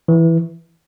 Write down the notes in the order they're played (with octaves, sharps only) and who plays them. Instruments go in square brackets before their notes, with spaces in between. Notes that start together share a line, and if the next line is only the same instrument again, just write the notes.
[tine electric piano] E3